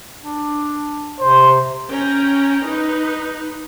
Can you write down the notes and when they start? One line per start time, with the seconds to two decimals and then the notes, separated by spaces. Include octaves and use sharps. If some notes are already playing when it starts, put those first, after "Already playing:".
0.23 D4
1.20 C3 C5
1.89 C#4 G5 A#5
2.65 D#4 B4